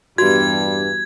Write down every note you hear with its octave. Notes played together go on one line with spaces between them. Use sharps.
E2 G2 G3 F#4 G#6